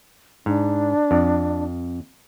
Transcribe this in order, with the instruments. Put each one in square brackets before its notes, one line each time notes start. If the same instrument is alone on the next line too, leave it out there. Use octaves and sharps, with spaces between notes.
[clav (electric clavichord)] G#2 [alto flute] D4
[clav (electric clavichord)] F2